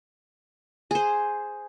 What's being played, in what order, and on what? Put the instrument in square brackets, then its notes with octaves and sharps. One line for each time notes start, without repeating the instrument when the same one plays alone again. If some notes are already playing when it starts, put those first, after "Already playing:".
[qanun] G#4 C5